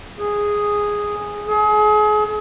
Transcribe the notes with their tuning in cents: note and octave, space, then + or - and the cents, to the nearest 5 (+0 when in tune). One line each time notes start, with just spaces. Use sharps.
G#4 -5
G#4 +35